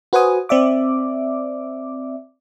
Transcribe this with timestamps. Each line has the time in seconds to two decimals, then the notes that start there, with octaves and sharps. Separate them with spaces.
0.13 F#4 B4 C5 F#5 G#5 D#6
0.49 C4 D5 E5 D6